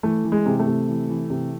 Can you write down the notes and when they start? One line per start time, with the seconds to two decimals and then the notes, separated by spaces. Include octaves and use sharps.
0.03 E3 A3
0.24 E3
0.32 G#3
0.46 C3
0.59 A3
0.66 C3
0.88 E3
1.09 E3
1.30 C3